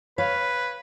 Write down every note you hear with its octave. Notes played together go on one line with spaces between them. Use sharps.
B4 C#5 F5